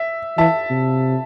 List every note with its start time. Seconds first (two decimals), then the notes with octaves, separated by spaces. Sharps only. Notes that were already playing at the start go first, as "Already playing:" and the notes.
Already playing: E5
0.38 E3 E5 A5
0.70 C3